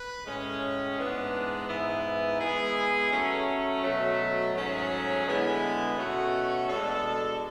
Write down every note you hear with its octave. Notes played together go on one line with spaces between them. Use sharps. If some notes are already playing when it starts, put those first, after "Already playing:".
Already playing: B4
A2 G#3 C#4 G#4
G#2 E3 G#3 B3 D4
G#2 E3 B3 E4
G#3 B3 E4 G#4
F#3 A3 C#4
B2 F#3 A3
G#2 F#3 A3 C#4 G#4
D3 G#3 B3 E4 G#4
B2 A3 C#4 F#4
B2 G#3 D4 A4